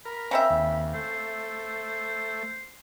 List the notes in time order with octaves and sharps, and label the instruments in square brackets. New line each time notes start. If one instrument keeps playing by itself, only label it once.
[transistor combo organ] A#4 [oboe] B5
[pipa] C#3 C4 E5
[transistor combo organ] D#2
[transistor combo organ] A3 [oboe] C5